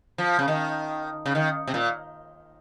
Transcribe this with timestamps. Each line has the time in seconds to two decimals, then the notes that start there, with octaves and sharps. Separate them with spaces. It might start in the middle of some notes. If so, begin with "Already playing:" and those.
0.18 F3
0.39 C#3
0.48 D#3
1.26 C#3
1.35 D#3
1.68 C3
1.74 A#2